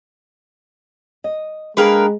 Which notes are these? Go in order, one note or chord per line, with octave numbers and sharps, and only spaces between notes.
D#5
G#3 A#3 D4 G#4 A#4 B4 G5